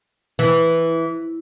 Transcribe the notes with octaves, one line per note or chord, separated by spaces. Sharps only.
E3